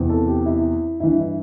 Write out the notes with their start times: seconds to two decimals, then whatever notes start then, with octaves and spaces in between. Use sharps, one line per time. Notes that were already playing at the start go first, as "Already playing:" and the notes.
Already playing: E2 C3 E3
0.09 A4
0.28 G4
0.46 E4
1.00 G2 E3 E4
1.19 E4